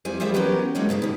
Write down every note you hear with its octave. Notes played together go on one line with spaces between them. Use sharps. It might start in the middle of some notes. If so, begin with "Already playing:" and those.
F2 G3 E4 G#5
D#2 F3 G3 E4 G#4 E5
E3 F#3 B3 C#4 G4 A#4
D3 F#3 G#3 A#3 C#4 D#4
G2 C#3 B3 D#4
D3 D#3